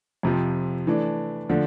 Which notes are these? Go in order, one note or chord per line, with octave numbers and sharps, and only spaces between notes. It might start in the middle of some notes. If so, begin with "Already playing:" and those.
F2 C3 F3
E3 A3 D4
D3 F3 A3 D4